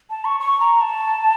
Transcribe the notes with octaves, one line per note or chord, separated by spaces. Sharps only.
A5
C#6
C#6
A#5
A5